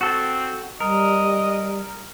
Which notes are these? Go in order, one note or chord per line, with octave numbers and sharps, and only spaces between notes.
C4 F#4 A4
G3 A#4 D#5